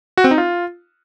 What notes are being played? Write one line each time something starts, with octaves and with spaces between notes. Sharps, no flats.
F#4
C4
D#4
F4